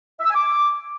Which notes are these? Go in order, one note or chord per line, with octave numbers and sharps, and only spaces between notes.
E5
E6
G#5
D6